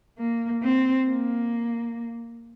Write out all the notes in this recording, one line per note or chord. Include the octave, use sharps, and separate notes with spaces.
A#3
C4
A#3